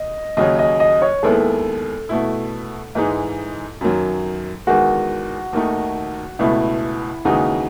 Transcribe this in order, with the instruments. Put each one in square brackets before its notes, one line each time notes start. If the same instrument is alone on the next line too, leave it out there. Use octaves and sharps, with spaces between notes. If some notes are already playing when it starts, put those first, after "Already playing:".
Already playing: [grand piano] D#5
[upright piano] D#2 C#3 F#3 C#4 [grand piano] D#5
[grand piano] D#5
D#5
C#5
[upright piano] D#2 D#3 G#3 B3 E4 [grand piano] A4
[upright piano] B2 A3 E4
G#2 E3 G#3 D#4
F#2 D#3 F#3
[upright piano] E2 D#3 G#3 [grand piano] F#4
[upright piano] D#2 D#3 A3 D#4
[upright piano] C#2 B2 A3 [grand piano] E4
[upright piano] D#2 C#3 E3 G#3 D#4 [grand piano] F#4